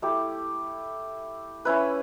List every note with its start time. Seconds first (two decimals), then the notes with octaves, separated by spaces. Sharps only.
0.02 A3 E4 G4
1.65 C#4 E4 B4